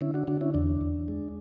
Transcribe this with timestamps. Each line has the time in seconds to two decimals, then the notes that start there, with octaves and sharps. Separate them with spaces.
0.01 D3 C#4 E4
0.14 D4 F#4
0.27 D3 D4 F#4
0.41 C#4 E4
0.54 E2 D4
0.81 E2
1.08 G#3